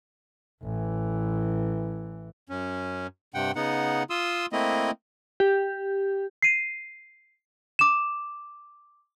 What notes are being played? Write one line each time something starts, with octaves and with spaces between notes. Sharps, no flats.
A1 E3
F#2 C#4
G2 C3 F#5 G5
C#3 B3 D#4 F#5
F4 C6 D#6 E6
A3 A#3 C4 E4 D#5
G4
C7 D#7
D6 E7